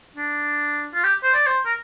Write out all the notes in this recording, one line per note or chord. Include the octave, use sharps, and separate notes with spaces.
D4
F4
G4
C5
D5
C5
A#4